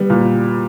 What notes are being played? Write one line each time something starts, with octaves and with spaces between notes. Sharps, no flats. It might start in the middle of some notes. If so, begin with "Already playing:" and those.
Already playing: G3 B3
A#2